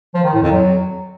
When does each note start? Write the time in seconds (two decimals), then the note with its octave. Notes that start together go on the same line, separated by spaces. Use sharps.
0.14 F3
0.24 D#3
0.33 A2
0.42 F2
0.51 F#3